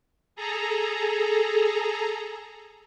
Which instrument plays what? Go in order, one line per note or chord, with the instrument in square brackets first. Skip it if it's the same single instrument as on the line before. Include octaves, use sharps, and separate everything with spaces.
[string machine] G#4 A4 A#5